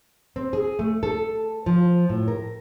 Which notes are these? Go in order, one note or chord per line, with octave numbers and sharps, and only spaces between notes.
C4
G#4
A3
A4
F3
A2
A#4